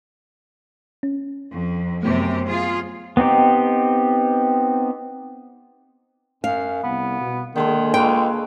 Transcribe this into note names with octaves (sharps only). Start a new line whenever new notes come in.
C#4
F2
F#2 C3 A3 B3 G4
F4 G#4
B3 C4 D#4 G4
F#2 F5
C2 B3
B2
D3 D#3 G#3 A#3 A4
C#2 B4 F5 G5 C#6